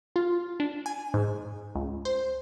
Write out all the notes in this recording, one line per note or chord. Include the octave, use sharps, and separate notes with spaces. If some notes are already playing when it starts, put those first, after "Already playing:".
F4
D4
G#5
G#2
C#2
C5